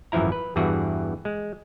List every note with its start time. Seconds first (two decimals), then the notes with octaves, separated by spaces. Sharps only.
0.12 G#1 F#2 E3 F3 E4 A#5
0.32 B4
0.56 E2 G2 E3 F#4 G#4
1.25 G#3